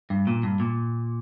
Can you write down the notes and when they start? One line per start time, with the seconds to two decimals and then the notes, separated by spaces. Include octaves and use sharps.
0.10 G2
0.27 A#2
0.43 G2
0.60 A#2